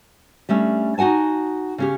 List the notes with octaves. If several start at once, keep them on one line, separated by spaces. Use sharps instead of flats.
G3 A3 C#4 D4
D#4 F#4 F#5 G#5 A5
C#3 C#4 G4